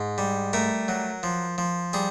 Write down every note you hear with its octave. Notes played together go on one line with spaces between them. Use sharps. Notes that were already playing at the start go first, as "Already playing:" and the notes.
Already playing: G#2
G3
A3 A#4
F#3
F3
F3
G3 G#4